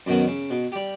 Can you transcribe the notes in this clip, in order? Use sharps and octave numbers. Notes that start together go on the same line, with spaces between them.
F#2 B2 D#3 F#3 B3
C#3
B2
G3 G4